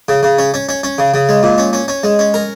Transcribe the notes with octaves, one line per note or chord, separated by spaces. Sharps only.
C#3
C#3
C#4
C#4
C#4
C#4
C#3
C#3
G#3
A#2
C#4
C#4
C#4
G#3
C#4
A#4